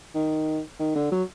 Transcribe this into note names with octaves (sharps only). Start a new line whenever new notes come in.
D#3
D#3
D3
F#3